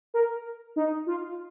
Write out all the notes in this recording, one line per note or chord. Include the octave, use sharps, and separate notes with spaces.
A#4
D#4
F4